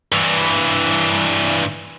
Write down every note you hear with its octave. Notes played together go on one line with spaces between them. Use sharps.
G2 E3